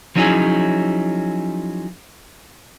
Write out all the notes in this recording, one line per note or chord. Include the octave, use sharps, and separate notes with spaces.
F3 F#3 C#4 D#4 E4 G#4